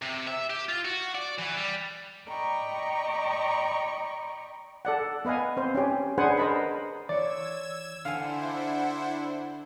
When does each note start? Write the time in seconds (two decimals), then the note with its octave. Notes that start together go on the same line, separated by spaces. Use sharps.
0.02 C3
0.27 E5
0.50 G4
0.69 F4
0.85 F#4
1.15 D5
1.38 E3
1.57 G3
2.27 D5 D#5 G5 A#5 B5 C#6
4.85 A4 D5 F#5
5.25 B3 B4 D#5 F5 G#5
5.57 C4 C5
5.75 C#4 G4
6.18 D4 G#4 B4 C5 F#5 G#5
6.37 A#4 C5 D#5 A5 B5
7.09 E3 C#5 D5 E6 G#6 E7
8.05 D3 D4 E4 C5 F5 F#5 G#5